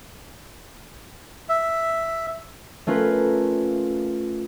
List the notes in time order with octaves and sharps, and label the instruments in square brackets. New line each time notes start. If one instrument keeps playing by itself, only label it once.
[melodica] E5
[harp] A3 C#4 F4 A#4 B4